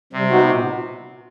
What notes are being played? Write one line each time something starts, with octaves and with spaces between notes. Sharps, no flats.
C3 G3
B3 D#4 F#4
A#2